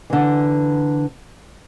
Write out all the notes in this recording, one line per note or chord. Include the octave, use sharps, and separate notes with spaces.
D3 E3